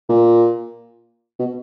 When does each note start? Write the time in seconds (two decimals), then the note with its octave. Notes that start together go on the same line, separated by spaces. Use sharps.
0.09 A#2
1.39 B2